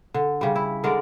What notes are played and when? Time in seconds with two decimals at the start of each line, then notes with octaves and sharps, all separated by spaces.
0.14 D3
0.41 C#3 G3
0.56 E4
0.84 D3 G#3 A#4 D5